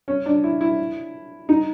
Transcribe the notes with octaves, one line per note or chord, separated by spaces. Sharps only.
C#4
D4
E4
E4
D#4